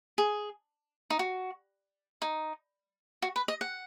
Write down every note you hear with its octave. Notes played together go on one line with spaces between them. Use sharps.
G#4
D#4
F#4
D#4
F#4
B4
D#5
F#5